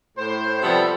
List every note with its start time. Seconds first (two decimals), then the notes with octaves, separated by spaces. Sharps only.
0.17 A2 C5
0.62 C3 F3 G3 B3 A4